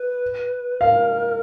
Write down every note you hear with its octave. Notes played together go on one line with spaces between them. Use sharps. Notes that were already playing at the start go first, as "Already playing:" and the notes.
Already playing: B4
A#4 F5